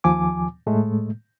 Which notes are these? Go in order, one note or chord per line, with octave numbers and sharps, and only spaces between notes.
D#2 F3 G#5 D6
A2 G#3 A3